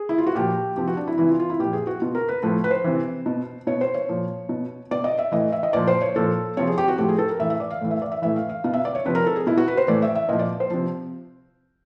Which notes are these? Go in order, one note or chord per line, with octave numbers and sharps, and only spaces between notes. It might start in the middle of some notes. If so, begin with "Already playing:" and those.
Already playing: G#4
E4
F4
F#4
A#2 F3 G4
C3 F3 G4
F#4
D4
E4
C3 E3 E4
F4
F4
E4
A#2 F3 G4
G#4
F#4
B2 F4
A#4
B4
A2 F3 B4
B4
C5
C3 E3
B2
B2 C#5
C5
C#5
A#2 F3
B2
B2 D5
D#5
E5
A2 E3 D#5
E5
D#5
A#2 F3 D5
C5
C#5
A#2 F3 A4
C3 F3 C#5
G#4
G4
F#4
A2 F3 G4
G#4
A4
A#4
A2 E3 E5
E5
D5
F5
A2 E3
E5
D5
E5
A2 E3 E5
F5
F5
B2 F5
E5
D5
C#5
C3 F3 B4
A#4
A4
G#4
B2 E4
F#4
B4
C5
A2 E3 D5
E5
E5
A#2 F3 D#5
D5
C5
C3 F3